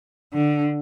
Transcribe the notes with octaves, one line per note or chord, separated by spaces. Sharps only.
D3